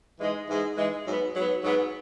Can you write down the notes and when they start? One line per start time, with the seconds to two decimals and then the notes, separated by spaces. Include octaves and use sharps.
0.20 G#2 E3 G#3
0.48 G#2 E3 G#3
0.77 G#2 E3 G#3
1.05 G#2 F#3 B3
1.34 G#2 F#3 B3
1.63 G#2 F#3 B3